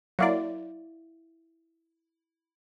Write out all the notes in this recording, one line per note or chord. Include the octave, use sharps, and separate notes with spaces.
F#3 A#3 E4 D5 E5 F5